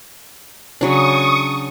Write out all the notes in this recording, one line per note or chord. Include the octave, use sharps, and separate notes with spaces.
C#3 F#3 D4 C#6 D#6